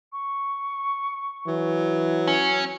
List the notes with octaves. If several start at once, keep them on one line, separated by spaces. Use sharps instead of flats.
C#6
E3 F#3
C#4 C#7